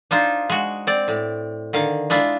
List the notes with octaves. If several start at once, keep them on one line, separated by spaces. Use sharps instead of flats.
D4 D#4 F4 C5
G#3 F#4
C4 D5
A2
D3 D#3 F5
G#3 D4 E4 F4